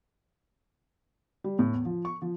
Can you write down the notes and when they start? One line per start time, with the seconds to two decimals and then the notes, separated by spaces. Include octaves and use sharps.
1.44 G3
1.59 A2
1.73 E2
1.85 F3
2.05 C#6
2.22 F3